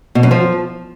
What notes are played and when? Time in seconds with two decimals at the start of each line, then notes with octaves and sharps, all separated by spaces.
0.15 B2
0.23 F#2
0.31 F3